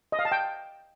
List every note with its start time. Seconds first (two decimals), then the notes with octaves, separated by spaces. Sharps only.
0.12 D#5
0.19 F5
0.25 A5
0.32 G5